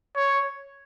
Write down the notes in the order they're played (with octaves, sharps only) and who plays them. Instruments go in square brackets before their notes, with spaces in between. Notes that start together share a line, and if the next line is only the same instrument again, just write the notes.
[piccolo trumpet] C#5